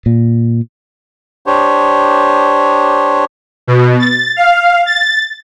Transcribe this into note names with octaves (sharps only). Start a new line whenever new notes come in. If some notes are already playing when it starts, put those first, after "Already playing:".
A#2
D4 G4 C5 C#5
B2
A6
F5
A6